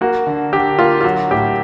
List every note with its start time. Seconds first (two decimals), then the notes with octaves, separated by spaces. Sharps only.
0.01 A#3 F#4
0.27 D3
0.53 D3 G4
0.79 A#3 F4
1.01 F4
1.04 F#3 F#4
1.31 A2 G4